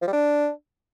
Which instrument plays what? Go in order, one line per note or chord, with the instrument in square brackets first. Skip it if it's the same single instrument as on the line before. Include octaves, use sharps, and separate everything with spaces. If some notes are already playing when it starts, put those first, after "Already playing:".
[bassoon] F3
G3
D4